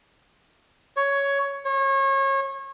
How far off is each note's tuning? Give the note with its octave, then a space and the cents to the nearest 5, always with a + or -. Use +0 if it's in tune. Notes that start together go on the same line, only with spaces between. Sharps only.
C#5 +10
C#5 -30